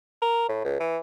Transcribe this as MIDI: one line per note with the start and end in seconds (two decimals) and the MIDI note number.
0.22 0.45 70
0.49 0.63 45
0.65 0.78 37
0.80 0.98 52